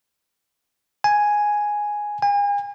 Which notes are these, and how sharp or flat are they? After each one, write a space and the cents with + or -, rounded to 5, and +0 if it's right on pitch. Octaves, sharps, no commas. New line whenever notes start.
G#5 +0
G#5 -40